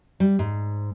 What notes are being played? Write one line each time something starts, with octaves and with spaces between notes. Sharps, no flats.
G3
G#2